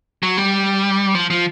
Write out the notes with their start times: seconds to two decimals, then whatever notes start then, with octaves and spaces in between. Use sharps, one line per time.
0.23 F#3
0.37 G3
1.15 F3
1.30 F3